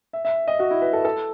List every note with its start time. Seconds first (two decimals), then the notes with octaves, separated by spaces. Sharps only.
0.13 E5
0.25 E5
0.48 D#5
0.59 F#4
0.71 E4
0.82 B4
0.93 A4
1.05 A4